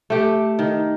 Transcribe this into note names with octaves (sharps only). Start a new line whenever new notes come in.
A3 G4
D#3